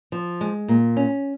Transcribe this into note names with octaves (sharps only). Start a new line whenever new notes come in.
F3
G#3
A#2
C#4